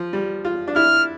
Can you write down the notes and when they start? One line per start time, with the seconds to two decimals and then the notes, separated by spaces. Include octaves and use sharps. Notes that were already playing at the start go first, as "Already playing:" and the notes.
Already playing: F3
0.13 G3
0.45 F4
0.68 D4
0.76 E4 F6